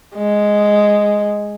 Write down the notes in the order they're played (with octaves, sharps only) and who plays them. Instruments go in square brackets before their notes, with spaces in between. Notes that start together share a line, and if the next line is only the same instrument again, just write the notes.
[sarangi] G#3